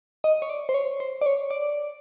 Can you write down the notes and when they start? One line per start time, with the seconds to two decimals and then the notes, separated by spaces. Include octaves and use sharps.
0.24 D#5
0.42 C#5
0.49 D5
0.69 C5
0.74 C#5
1.00 C5
1.21 D5
1.26 C#5
1.51 D5